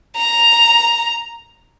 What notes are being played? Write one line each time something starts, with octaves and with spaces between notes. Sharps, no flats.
A#5